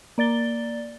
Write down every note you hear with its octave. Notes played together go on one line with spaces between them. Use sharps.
A#3 D5 A6 G7